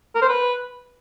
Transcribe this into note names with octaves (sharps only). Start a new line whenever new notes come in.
A#4
C5
B4